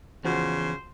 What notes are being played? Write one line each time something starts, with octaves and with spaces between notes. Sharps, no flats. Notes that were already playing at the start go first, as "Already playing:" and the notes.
E2 C#3 F3 F#4 C5